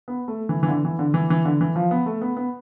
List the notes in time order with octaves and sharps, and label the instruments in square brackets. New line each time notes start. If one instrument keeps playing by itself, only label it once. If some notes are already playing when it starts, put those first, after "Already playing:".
[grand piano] B3
A3
E3
E3
D3
E3
D3
E3
E3
D3
E3
F3
B3
A3
B3
B3